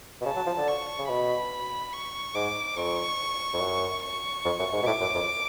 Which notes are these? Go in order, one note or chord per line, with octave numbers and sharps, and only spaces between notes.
B2
C#3 A5
F#3
F3
D3
C#6
C#3
B2 B5
C#6
G#2 D6
F2 C#6
F2
F#2
C#6
F2
F#2
G#2
B2
A2 D6
F#2
F2